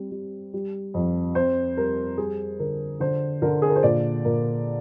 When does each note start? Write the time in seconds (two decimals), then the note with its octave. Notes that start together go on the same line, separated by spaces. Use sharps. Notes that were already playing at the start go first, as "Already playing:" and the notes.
Already playing: G3 C4
0.11 G3
0.54 G3
0.94 F2
1.35 C4 C5
1.77 G3 A#4
2.18 G3 G#4
2.59 D3 A#4
3.00 D3 C5
3.42 D3 A#4
3.62 G#4
3.69 A#4
3.76 C5
3.83 A#2 D5
4.25 A#2 A#4